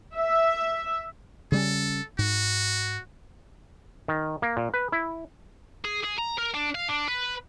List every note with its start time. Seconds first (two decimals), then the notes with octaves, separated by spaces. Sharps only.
0.14 E5
1.52 C#3 G3 C#4 A4
2.19 G#2 F#4
4.08 D#3
4.42 A#3
4.57 A#2
4.74 B4
4.92 E4
5.85 G#4
6.04 G#4
6.19 A#5
6.39 A#4
6.55 D4
6.75 F5
6.89 D4
7.08 B4